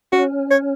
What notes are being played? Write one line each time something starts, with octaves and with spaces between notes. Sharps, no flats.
C#4 F#4
C#5